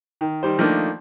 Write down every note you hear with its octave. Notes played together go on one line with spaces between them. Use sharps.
D#3
D#3 G3 C5
D#3 F3 A3 A#3 D4 D#4